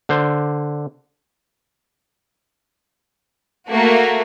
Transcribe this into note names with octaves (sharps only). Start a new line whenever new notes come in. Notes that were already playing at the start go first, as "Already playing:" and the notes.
D3 C5
A3 A#3 F#4